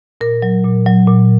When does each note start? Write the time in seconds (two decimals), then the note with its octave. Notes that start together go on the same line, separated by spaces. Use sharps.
0.21 A#2 A#4
0.42 F#3
0.64 A#2
0.86 F#3
1.07 A#2